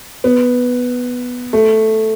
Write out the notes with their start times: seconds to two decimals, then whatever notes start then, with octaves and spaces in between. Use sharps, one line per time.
0.24 B3
1.53 A3